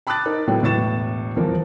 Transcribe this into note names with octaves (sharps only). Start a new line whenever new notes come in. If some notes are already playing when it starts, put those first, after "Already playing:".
A5 B5 D6 D#6 F#6 A6
D#4 A#4
A2 F#3 A3 B3
E1 A2 B3 C#6 A6 E7
D#1 E2 E3 F3 A#4